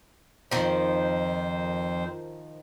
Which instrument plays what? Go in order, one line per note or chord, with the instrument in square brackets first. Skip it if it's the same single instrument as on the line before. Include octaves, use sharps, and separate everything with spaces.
[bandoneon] F2 C5 [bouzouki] D#3 F3